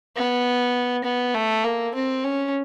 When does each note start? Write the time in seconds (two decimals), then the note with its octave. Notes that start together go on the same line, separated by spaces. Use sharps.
0.16 B3
1.04 B3
1.34 A3
1.64 A#3
1.95 C4
2.24 C#4